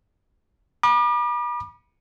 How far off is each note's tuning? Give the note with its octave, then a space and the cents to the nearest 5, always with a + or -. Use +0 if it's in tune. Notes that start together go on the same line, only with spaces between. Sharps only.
B5 -35 D6 +40